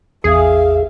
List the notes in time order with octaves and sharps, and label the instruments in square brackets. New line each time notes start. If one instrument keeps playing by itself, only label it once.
[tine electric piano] A1 E2 [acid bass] G#4 [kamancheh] E5 F5